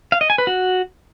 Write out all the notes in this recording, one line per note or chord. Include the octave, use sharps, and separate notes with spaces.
F5
D#5
G#5
B4
F#4